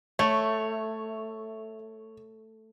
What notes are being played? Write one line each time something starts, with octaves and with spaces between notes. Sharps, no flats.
A3 C#5 E5